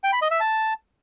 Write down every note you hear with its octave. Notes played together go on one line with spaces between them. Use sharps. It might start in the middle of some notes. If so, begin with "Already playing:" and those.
G5
B5
D#5
E5
A5